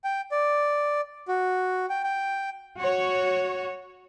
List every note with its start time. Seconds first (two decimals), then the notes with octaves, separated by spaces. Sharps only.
0.04 G5
0.32 D5
1.28 F#4
1.89 G5
2.04 G5
2.81 F#4 C#5